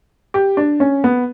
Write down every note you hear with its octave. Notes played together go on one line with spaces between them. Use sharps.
G4
D4
C#4
B3